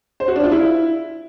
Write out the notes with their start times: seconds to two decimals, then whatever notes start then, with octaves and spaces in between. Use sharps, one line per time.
0.20 C5
0.28 F#4
0.36 D4
0.44 F4
0.51 E4